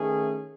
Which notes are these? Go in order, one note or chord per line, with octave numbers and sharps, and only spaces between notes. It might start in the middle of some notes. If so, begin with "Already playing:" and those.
Already playing: D#3 A3 C#4 G#4